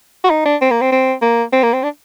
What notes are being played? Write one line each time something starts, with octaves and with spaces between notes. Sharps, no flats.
F#4
D#4
D4
C4
A#3
C4
C4
A#3
C4
A#3
C4
D4